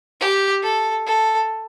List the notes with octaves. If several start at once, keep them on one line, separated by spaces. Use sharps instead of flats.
G4
A4
A4